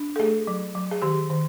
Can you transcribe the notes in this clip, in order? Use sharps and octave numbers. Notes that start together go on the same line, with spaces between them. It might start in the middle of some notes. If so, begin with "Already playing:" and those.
Already playing: D4
A4
A3 G#4
F#3
F#3
G#4
D#3 G4
D#3